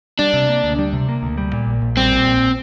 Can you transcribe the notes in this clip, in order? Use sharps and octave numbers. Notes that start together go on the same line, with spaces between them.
G3 D4
C3
A#3
D2
G3
C3
A#3
D2
G3
A#2
A#1
A#1
G3 C4
A#2
A#1